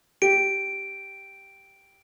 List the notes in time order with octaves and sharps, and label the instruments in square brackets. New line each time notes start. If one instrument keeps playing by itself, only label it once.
[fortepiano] G4 [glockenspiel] D7